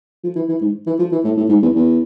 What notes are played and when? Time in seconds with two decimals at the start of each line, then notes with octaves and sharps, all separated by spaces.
0.24 F3
0.36 E3
0.49 E3
0.61 G#2
0.87 E3
0.99 F3
1.12 E3
1.24 A2
1.37 A2
1.49 G#2
1.62 E2
1.75 E2